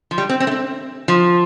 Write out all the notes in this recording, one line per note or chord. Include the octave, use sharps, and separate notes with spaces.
F3
G3
C4
C4
A3
C4
F3